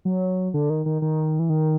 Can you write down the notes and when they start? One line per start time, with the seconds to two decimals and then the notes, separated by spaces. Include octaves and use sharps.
0.05 F#3
0.54 D3
0.70 D#3
0.86 D#3
1.02 D#3
1.39 E3
1.50 D#3